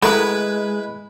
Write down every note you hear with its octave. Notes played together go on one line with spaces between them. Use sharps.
G#3 A3 E4 A#4 B4